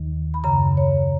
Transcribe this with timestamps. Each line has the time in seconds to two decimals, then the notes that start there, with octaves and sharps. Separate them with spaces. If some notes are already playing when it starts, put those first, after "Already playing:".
Already playing: D#2 D#3
0.34 B5
0.44 F#2 C#3 A#5
0.77 C#5